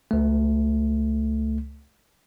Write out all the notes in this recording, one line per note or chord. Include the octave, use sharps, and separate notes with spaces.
C#2 A3